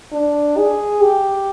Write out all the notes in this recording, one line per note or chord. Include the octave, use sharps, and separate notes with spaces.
D4
G#4
G4